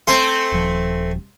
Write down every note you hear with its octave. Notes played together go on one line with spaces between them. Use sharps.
A3 C4 G#5 C6
D#1 F3